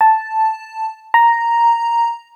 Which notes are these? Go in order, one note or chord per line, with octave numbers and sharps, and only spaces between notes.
A5
A#5